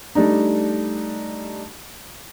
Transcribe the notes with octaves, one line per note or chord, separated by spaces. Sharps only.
G3 A3 D4 D#4